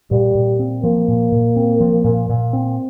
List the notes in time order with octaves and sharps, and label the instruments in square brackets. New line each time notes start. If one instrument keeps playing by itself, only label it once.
[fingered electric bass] A#2 [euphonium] G3
[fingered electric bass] A#2
C4
[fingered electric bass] F3 [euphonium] A#3
[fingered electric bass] A#2
A#2
C4
F3
A#2
A#2
C4